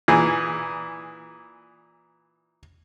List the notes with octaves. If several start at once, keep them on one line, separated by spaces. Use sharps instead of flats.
A#2 E3 G#4